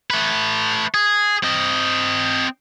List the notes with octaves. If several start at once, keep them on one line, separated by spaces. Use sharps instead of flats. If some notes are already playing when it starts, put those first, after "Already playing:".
A3 B4
G#4
C4 D#5